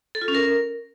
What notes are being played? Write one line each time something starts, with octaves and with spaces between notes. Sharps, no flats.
A4
F4
C#4
A#4